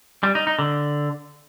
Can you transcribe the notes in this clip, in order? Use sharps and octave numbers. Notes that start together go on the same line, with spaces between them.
G3
D#4
D#4
D3